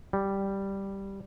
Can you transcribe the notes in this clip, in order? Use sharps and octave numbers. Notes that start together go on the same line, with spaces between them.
G3